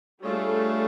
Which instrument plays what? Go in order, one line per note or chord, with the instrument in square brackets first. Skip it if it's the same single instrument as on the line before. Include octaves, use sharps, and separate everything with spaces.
[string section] G3 A3 [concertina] D4 F4 G#4 C#5